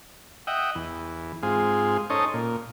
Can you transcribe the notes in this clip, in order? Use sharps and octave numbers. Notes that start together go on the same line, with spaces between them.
D#5 E5 F#5 G5
E2
G#2 C4 F4 G#4
C#4 D#4 A4 C5 C#5 D#5
A#2